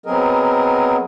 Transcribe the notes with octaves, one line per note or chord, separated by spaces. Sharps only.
F#3 B3 C4 G#4 A#4 D#5